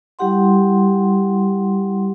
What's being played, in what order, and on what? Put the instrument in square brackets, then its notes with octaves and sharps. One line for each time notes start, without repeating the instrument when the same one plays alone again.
[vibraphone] G3 E4 G4 F#5 C6